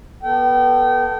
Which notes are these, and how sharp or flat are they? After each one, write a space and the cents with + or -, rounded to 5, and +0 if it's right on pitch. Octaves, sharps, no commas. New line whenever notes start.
B3 -20 A4 +0 G5 -30